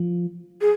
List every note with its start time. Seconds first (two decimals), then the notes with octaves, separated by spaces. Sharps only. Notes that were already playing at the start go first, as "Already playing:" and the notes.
Already playing: F3
0.61 G#4